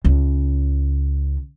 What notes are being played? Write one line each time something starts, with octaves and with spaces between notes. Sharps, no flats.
C#2 C#3